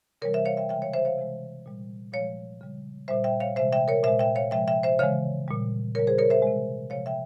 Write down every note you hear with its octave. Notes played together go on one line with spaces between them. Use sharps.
C3 E3 G3 A#4 C#5
C5 E5
C#5 F5
E5 G5
C#3 E3 G#3 E5 G5
C#5 F5
C5 E5
C#5 F5
C3 E3 G#3
A#2 G3
A#2 F3 G#3 C#5 F5
C#3 G3
A#2 G3 C5 E5
E5 G5
C#5 F5
C3 E3 G#3 C5 E5
E5 G5
A#4 C#5
A#2 G#3 C5 E5
E5 G5
C#5 F5
C3 F3 G#3 E5 G5
E5 G5
C5 E5
C#3 E3 G#3 C#5 F5
A#2 G3
C#3 G3 A#4 C#5
G#4 C5
A#4 C#5
C5 E5
C3 E3 G#3
C3 F3 G#3 C#5 F5
E5 G5